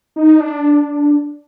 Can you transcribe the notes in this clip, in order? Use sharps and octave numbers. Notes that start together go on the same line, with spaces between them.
D#4
D4